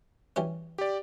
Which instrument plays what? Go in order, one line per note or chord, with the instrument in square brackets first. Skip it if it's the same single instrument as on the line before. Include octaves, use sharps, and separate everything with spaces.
[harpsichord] E3 G3 C#4
[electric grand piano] G4 D5